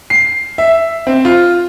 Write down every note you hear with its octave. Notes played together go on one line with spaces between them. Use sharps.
C7
E5
C4
F4